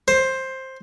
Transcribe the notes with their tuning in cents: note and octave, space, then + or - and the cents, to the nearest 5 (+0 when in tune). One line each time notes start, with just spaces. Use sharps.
C5 +10